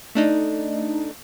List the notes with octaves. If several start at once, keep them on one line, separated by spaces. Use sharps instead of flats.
A3 D4 D#4